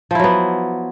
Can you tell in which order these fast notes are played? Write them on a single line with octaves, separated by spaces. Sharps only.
F3 E4 F#3 B3